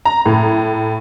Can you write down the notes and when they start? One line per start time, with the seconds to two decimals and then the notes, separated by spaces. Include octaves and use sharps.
0.05 A#5
0.26 A2